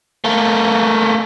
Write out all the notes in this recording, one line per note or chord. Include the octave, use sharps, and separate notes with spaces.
A3 A#3